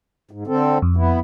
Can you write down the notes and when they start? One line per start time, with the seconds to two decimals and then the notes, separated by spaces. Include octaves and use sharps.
0.31 G#2
0.47 D3 C4 A4
0.82 F2
0.97 B3 E4